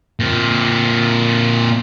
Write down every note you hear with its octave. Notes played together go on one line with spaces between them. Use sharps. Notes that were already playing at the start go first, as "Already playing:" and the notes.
A#2 C4